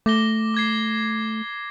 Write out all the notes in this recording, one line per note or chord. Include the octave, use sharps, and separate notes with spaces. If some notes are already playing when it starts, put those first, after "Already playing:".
A3 D6 A#6 G7
D6 G#6 C7